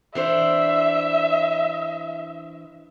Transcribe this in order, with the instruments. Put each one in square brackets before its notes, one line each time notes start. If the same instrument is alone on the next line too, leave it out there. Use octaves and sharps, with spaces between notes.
[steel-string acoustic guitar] E3 D4 C5 [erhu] E5